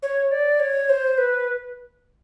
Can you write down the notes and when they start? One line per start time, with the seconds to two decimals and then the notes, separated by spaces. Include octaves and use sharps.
0.03 C#5
0.31 D5
0.60 C#5
0.89 C5
1.18 B4